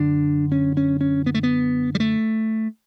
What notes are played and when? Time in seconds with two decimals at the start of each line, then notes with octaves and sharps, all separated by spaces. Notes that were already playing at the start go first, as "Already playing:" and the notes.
Already playing: F#2 D3 D4
0.52 C#4
0.77 C#4
1.01 C#4
1.26 B3
1.35 A3
1.43 B3
1.95 G3
2.00 A3